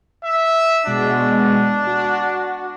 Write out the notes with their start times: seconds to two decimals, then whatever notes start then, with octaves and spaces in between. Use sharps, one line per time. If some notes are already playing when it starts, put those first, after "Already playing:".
0.25 E5
0.87 B2 G#3 D4 F#4
1.87 F#4